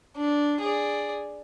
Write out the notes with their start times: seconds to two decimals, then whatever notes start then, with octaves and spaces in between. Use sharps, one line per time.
0.17 D4
0.61 G#4 D5